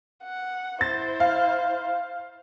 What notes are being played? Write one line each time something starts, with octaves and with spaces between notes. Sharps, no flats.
F#5
E4 C5 A6
F5